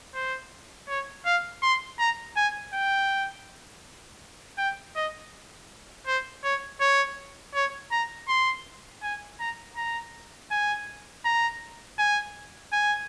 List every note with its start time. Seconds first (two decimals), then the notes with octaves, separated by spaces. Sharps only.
0.14 C5
0.89 C#5
1.26 F5
1.63 C6
1.99 A#5
2.36 G#5
2.74 G5
4.58 G5
4.96 D#5
6.07 C5
6.44 C#5
6.81 C#5
7.55 C#5
7.92 A#5
8.29 C6
9.03 G#5
9.40 A#5
9.76 A#5
10.51 G#5
11.25 A#5
11.99 G#5
12.73 G#5